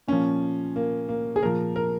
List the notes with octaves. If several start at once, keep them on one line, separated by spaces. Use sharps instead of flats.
A#2 F3 C#4
A#3
A#3
G#4
A#2 F3 A#4
A#4